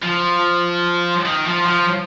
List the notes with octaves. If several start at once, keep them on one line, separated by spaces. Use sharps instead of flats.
F3
D#3
F3
F3